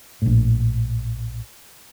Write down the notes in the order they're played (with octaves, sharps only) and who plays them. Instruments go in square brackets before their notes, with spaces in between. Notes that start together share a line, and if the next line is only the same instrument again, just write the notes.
[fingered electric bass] A#1 A2